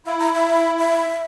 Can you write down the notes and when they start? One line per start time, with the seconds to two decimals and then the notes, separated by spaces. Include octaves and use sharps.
0.06 E4 F5
0.19 A#5
0.34 E5
0.79 E5